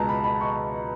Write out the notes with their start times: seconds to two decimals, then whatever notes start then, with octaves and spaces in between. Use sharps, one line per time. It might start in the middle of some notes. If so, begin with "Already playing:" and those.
Already playing: C#2 B2 G#3 A5 A#5
0.09 B5
0.24 B5
0.41 C#6